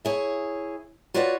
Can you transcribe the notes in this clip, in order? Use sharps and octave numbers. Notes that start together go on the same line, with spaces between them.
E4 G#4 C#5
F4 F#4 B4 C#5 D5 F#5